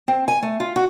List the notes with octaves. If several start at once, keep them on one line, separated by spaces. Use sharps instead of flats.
C4
G#5
A3
F4
F#4